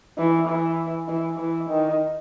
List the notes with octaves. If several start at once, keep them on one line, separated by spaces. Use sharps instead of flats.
E3
E3
E3
E3
D#3